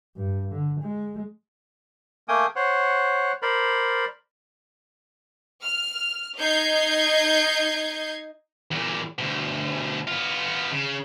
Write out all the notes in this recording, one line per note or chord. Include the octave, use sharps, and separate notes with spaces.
G2
D3
G#3
A3 A#3 G5 G#5 D#6
C5 C#5 F#5
A#4 C5 D5 B5
F6
D#4 D#5 G6 G#6 C7
E2 A#2
D2 B2
B3 F4
C#3